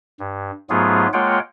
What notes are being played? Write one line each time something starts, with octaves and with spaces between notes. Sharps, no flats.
G2
G#2 F#3 A3 B3 F4 G#4
G#3 A#3 F4 C#5 F#5 G5